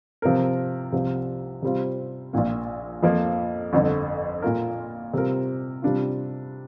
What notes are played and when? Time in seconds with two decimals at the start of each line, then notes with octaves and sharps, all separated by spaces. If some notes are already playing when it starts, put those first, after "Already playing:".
0.22 C3 F3 C4 A#4
0.92 C2 C3 F3 C4
1.63 C3 G3 C4 F4
2.33 A#1 A#2 A#3
3.03 F2 F3 A#3
3.73 G1 F2 D3
4.42 A#2 A#3 F4 A#4
5.14 C3 G3 C4 F4 A#4
5.82 C3 G3 D4 F4